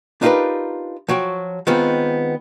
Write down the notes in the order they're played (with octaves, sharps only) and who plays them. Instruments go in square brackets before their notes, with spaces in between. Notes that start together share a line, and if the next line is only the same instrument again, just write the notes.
[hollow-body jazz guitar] D4 D#4 F4 G4 A#4 B4
F3 F#3 F#4 G5
D#3 G#3 B3 C4 D#4 F4